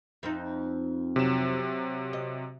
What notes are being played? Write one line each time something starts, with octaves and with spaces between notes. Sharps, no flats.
F2 C4 D#4
C3 F#3 E7
D#5